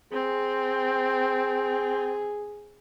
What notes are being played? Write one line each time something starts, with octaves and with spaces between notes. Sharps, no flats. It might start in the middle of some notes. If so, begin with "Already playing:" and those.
C4 G#4